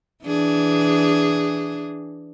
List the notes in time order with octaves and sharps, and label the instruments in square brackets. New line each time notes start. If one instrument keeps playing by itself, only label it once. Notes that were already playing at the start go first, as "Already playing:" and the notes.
[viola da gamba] E3 D4 G#4